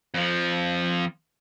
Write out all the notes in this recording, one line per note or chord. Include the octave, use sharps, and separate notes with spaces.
F2 F3